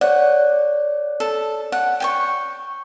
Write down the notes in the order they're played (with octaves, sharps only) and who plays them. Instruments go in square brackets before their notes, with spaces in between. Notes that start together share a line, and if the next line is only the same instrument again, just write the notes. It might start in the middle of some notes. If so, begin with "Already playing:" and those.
[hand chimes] C#5 D5 [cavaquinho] F#5
[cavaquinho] A4
F#5
G5 G#5 C#6